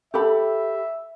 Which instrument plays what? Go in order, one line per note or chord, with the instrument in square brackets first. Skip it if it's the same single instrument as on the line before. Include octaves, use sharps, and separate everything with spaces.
[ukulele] G4 A4 B5 [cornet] E5